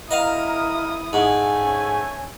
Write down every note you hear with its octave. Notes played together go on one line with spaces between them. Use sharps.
E4 A#4 D#5 F5 D#6
G#2 A3 G#5
C#4